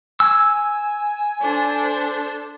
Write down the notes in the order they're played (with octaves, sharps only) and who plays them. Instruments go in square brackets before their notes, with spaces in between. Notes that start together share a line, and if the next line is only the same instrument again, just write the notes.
[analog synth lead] G#5 [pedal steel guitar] E6
[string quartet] D4 A4 C5